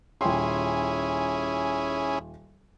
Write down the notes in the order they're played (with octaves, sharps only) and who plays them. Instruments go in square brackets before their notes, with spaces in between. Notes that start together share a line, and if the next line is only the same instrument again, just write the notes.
[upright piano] D#1 G5 C6 [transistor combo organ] C#4 E4 G#4